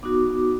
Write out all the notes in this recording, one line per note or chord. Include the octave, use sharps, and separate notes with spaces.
B3 D#4 F#4 D6